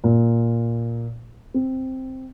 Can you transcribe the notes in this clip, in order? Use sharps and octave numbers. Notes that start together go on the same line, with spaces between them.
A#2
C4